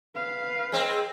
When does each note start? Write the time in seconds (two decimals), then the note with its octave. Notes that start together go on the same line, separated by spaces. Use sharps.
0.15 B4 F5
0.72 G#3 C4